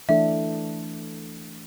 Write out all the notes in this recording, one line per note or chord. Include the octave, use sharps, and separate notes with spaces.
E3 A3 D4 A4 E5